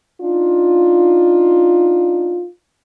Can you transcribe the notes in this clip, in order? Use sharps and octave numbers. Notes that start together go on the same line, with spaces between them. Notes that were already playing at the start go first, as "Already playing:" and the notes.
D4 D#4 F4